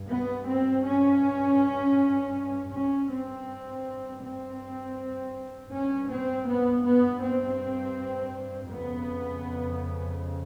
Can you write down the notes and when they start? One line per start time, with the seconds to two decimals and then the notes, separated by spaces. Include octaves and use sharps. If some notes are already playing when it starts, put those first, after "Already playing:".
Already playing: G2
0.09 B3
0.47 C4
0.84 C#4
2.72 G2 C#4
3.09 C4
4.22 C4
5.71 G2 C#4
6.09 C4
6.46 B3
6.84 B3
7.21 C4
8.71 F2 C#3 B3